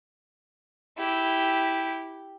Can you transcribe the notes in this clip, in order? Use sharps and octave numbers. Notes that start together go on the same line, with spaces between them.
E4 G4